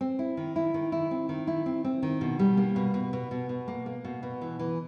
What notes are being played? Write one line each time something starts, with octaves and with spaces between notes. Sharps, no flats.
C4
E4
D#3
E4
D#3
E4
C4
D#3
E4
C4
C4
D#3
B2
G3
A#3
B2
B2
B2
B2
B2
A#3
A#3
B2
B2
E3
E3